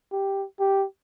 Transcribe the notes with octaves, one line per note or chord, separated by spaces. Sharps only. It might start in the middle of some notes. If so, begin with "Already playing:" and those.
G4
G4